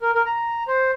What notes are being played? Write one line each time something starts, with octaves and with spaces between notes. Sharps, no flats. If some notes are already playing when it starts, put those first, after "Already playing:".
A#4
A#4
A#5
C5